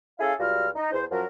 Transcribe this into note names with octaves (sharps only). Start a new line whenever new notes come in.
C#4 E4 G#4 A4 F5
C#2 G3 F4 F#4 F5 F6
D#4
E2 C5
F#2 F3 F#3 F#4 A#4